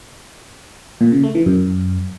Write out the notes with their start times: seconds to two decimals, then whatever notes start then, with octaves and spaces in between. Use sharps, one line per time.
1.01 A#2
1.12 C#3
1.23 A3
1.35 E3
1.46 F#2